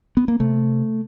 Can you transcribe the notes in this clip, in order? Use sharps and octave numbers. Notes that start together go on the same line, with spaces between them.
B3
A#3
C3 A3